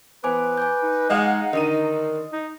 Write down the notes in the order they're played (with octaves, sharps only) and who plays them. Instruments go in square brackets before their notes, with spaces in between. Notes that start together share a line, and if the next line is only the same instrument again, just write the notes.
[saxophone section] E3 B3 [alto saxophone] B4 [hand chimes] C5 G#5 D6
[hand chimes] G#5 D6 G6
[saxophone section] D#4
[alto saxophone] G#3 [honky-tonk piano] D#5 F5 F#5
[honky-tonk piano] D3 D#7 [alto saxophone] D#3 [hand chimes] D#5 D#6
[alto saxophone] D#4